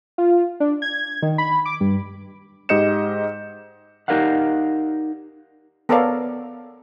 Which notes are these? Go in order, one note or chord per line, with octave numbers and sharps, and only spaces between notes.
F4
D4
G#6
D#3
B5
D6
G2
G#2 G4 D#5 G6 C#7 E7
D#4 G4 A#4 D5 F5 F#5
B3 A4 A#4 C#5 D5 F5